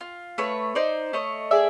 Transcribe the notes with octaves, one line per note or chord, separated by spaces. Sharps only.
F4
A3 B4 C#5
D#4 C5 D5
A3 C#5 D#5
G#4 D5 E5